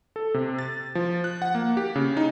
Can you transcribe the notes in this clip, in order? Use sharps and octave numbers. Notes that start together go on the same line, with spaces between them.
A4
C3
A6
F3
F#6
F#5
A#3
G4
C#3
D#4